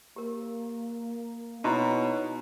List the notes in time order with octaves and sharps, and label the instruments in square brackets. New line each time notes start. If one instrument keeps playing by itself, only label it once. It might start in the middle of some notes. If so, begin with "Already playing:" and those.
[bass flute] A#3 [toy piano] G4 A#4
[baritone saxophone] B2 [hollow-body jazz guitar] D#4 [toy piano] E4 A#5 C6 [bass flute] C#5